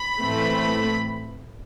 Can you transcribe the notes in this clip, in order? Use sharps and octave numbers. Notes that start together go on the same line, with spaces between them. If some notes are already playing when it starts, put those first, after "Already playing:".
Already playing: B5
A2 E3 A3 C4